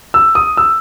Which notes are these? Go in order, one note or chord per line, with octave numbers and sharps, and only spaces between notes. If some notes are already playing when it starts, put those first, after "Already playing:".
E6
D#6
E6